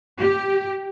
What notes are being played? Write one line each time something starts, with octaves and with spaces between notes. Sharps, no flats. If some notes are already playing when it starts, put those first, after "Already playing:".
G4